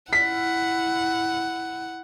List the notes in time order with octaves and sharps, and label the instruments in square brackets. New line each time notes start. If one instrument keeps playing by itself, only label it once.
[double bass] E4 [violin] F#5 [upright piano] B6